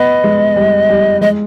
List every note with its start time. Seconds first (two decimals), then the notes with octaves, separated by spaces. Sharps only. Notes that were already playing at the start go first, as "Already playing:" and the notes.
Already playing: B3 D#5
0.24 G#3
0.56 G3
0.89 G3
1.21 G#3 D#5